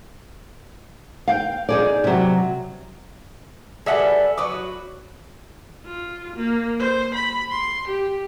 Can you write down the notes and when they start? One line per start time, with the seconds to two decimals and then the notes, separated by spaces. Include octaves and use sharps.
1.28 F5 G5
1.69 D#4 G#4 D5
2.04 C3 F#3
3.86 G3 G#4 A4 B4 E5 F#5
4.38 F#3 F#4 B4 D6
5.85 F4
6.36 A#3
6.79 C5
7.15 B5
7.51 C6
7.88 G4